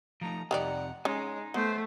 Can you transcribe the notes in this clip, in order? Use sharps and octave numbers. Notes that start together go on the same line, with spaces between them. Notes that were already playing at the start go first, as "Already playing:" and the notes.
F3 A3 D#4 A#5
F2 C3 D#3 G3 D5 F#5 A#5
G#3 C#4 D#4
A3 B3 C5